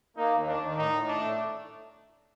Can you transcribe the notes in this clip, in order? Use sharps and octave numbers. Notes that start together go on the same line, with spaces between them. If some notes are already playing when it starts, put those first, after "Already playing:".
A#3 D#4
D#2
D#3 D4
D#3
A2 D#4
A2
A3 D4
A2